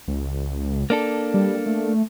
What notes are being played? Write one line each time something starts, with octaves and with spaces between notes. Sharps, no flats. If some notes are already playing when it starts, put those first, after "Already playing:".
C#2
A#3 D4 A4
G3
A3